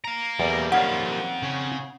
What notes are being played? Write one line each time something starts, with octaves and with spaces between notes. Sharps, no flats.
F5 A#5
E2 G3 A#3 D5
D#3 C4 C#4 D5 F5 F#5
C#3